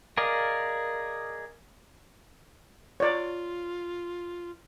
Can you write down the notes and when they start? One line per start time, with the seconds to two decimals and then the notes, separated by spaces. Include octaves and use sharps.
0.17 G#4 A#4 D5 D#5 F5
3.00 F4 C#5 D5